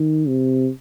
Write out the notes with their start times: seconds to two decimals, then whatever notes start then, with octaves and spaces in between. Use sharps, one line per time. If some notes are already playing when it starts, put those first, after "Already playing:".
Already playing: D#3
0.28 C3